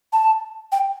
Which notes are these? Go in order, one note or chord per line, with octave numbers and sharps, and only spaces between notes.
A5
G5